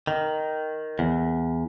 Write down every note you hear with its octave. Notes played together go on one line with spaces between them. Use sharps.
D#3
E2